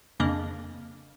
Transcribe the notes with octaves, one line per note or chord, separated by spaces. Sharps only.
F2 C#3 A#3 D4 D#5